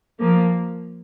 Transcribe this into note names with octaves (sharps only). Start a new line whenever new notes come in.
F3 A#3